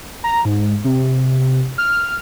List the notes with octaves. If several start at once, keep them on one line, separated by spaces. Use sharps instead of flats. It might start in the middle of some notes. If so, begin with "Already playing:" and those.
A#5
G#2
C3
F6